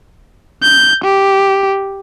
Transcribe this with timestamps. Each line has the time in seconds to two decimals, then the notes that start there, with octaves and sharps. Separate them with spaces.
0.63 G6
1.05 G4